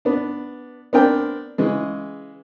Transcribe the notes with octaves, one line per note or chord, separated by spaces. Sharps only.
B3 D4
B3 C4 D4 A#4 G5
C#3 E3 G#3